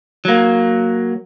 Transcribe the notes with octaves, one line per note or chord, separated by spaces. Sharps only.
F#3 A#3